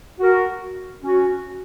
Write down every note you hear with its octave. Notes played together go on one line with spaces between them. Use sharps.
F#4 A#4
C#4 F#4